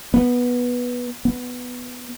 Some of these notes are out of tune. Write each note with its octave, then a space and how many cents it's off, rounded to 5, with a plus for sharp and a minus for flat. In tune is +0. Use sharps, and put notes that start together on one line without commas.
B3 -10
B3 +5